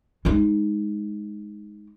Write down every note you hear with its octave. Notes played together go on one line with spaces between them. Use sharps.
G#3 D#4